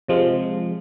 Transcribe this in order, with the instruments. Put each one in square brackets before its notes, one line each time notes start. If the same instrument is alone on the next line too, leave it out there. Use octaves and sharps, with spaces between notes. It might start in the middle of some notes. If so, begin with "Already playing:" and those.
[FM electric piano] C3 F3 G#3